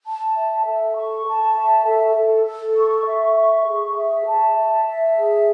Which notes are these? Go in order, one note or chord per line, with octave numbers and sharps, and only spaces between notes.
A5
E5
A4
C#6
A5
E5
A4
A4
A4
C#6
E5
C#6
G#4
E5
A5
E5
E5
G#4